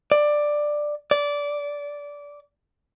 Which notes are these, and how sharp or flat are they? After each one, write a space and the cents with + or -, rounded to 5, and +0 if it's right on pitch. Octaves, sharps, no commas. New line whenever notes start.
D5 +10
D5 -20